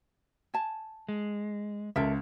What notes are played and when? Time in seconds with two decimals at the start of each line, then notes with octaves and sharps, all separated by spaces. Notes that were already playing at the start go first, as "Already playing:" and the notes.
0.54 G#5 A5
1.09 G#3
1.96 C#2 A4 A#4 E5